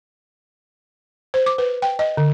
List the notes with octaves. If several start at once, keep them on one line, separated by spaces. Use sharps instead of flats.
C5
D6
B4
G5
D#5
D3